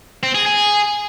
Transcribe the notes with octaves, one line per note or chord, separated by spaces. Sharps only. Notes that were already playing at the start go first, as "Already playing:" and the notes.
C4
G#4
G#4